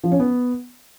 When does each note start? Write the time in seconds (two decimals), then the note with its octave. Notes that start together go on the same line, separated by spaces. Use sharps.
0.04 F3
0.12 C#4
0.20 B3